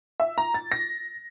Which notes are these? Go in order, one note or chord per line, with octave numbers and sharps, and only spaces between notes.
E5
A#5
A6
A#6